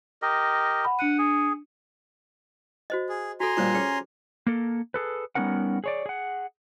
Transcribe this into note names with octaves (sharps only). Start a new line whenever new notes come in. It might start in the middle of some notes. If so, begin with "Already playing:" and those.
G4 A#4 D#5
F#5 B5
D4 F#5 C#7 D#7
G#4
F#4 C5 D#5
G#4
F#4 A4 G#5 A#5 C6
A#2 G3 D4 F4 C5 C#5
C#4 G#4
A#3 A4
G#4 A4 B4
G3 B3 C#4 D#4 A#4 F#5
G#4 C#5 D5
G#4 F#5